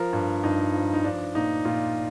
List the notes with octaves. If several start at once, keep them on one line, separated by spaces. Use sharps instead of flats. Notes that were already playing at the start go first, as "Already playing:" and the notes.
Already playing: F3 A#4
G2
G2 D#4
F3
D#4
F3 D4
A#2 D#4
A#2 F4